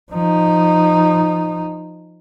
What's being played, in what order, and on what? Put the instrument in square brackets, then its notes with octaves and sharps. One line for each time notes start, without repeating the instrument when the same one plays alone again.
[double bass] F3 D#4